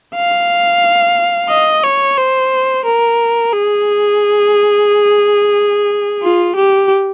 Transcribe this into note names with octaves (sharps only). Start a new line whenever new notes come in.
F5
D#5
C#5
C5
A#4
G#4
F4
G4